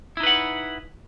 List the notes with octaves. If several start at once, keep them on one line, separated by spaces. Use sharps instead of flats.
D#4 E4 B4 F#5